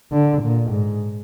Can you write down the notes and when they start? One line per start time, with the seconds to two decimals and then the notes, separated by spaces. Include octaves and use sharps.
0.12 D3
0.42 A#2
0.71 G#2